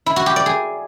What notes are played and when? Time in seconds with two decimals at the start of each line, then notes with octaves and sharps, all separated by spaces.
0.06 E4
0.16 F#4
0.26 G4
0.36 D5
0.46 G#4